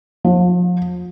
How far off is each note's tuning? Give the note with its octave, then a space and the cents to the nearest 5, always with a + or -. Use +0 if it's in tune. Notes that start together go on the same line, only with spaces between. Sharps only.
F3 +35